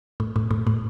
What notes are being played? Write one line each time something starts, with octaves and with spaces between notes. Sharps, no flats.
A2
A2
A2
A2